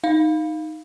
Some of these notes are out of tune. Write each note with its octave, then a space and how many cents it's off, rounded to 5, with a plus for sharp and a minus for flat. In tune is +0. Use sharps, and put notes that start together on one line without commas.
D#4 +0 F5 +0